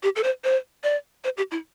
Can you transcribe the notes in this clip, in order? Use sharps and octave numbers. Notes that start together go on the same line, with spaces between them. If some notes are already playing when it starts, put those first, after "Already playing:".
G4
A4
C5
C5
D5
C5
G4
E4